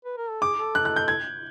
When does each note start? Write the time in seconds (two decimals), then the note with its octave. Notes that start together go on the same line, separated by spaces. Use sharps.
0.05 B4
0.17 A#4
0.30 A4
0.41 G#4 D6
0.58 A4
0.75 F#6
0.85 F#6
0.96 G6
1.08 G#6